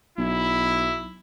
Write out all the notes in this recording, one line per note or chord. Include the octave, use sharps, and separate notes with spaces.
B1 E4